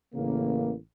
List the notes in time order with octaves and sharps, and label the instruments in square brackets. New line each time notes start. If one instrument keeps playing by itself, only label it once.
[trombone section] A1 C#3 A#3